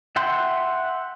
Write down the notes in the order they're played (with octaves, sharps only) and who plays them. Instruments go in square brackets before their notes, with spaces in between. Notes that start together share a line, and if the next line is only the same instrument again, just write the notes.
[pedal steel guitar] E5 F#5 G5 C6